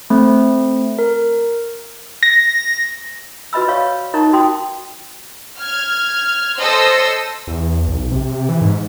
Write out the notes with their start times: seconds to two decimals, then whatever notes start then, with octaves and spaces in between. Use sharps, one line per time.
0.10 A3 C4
0.99 A#4
2.23 A#6
3.53 F#4 B4 D#5 B5 E6
3.68 C#5 D5 F5 C#6
4.14 D#4 A#4 D#5 A#5 C#6
4.33 F#4 G5 C6 D#6
5.60 F6 G#6
6.58 A4 C5 D#5 C6 E6
7.48 E2
7.87 B1
8.12 C3
8.27 C3
8.49 E3
8.61 G#2